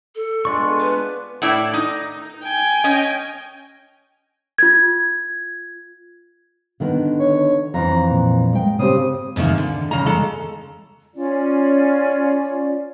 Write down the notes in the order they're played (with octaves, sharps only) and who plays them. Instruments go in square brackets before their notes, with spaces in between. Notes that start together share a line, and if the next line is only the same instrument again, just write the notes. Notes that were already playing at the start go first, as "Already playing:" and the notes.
[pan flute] A4
[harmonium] G#3 D4 F4 [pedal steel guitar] B3 D5 C#6
[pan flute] B4
[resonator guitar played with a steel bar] A2 E4 D5
D#4
[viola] G5 G#5
[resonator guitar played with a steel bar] C#4 D#5
[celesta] F4 G#6
[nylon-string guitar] D3 D#3 B3
[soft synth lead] C#5
[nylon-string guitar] F2 E3 [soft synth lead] A#5
[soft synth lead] A#2
[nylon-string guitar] G#3 G5
[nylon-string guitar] C#3 C4 G4 [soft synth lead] D#6
[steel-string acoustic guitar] G#2 C3 D#3 A#3
D3
C#3 A#5
G#3 A4
[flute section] C#4 F4 D5